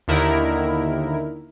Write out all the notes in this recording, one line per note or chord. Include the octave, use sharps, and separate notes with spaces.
D#2 D3 D#4 E4 A#4